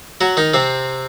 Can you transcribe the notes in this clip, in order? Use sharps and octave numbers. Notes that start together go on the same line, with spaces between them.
F#3 F#4
D#3 D#4
C3 C4